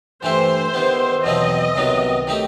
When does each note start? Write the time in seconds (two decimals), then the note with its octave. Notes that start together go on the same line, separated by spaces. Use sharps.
0.23 G2 E3 A3 E4 G4 C5
0.74 D#3 G3 B3 E4
1.24 E2 B2 F#3 C4 E4 D#5
1.75 C2 C3 D#3 F#3 B3
2.27 D#3 A3 D#4 G4